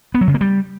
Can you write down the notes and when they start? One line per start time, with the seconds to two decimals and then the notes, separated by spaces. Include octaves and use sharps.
0.14 B3
0.21 F#3
0.28 C#3
0.34 A#3
0.41 G3